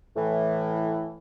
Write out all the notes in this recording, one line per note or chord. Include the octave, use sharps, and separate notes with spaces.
A2 E3